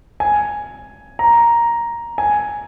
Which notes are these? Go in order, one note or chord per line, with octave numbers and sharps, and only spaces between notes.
G#5
A#5
G#5